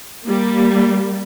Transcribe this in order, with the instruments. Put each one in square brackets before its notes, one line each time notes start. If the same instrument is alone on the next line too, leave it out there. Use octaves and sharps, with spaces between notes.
[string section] G3 A#3